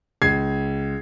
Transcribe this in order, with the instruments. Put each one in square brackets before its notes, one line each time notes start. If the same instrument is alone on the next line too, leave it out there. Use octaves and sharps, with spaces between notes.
[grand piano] C#2 G#6 C7